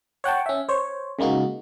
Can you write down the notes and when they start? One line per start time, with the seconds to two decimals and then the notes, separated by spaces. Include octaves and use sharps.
0.24 C#5 F#5 G5 A5
0.46 C#4 E5
0.69 C5 C#5
1.19 C#3 G#3 A#3 D#4 F#4